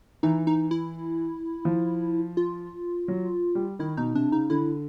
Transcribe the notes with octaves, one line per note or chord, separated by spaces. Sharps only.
E3 D#4
D#4
E4
F3
F4
F#3
G3
D#3 E4
B2 D#4
C3 D4
C#3 D#4
D3 E4